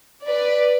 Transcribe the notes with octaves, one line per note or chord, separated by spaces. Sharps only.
B4 D5